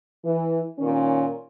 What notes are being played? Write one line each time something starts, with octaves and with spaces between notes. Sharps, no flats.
E3
A#2 D#3 C#4